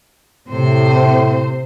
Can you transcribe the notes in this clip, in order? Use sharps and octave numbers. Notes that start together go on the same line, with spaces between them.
A2 C3 C5